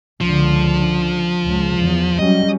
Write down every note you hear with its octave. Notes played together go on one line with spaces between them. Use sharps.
C#2 D3 F3
C#2
E2
F#3 G3 C#4 D#5